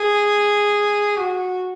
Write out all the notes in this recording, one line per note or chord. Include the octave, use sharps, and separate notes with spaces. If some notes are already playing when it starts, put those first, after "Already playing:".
Already playing: G#4
F#4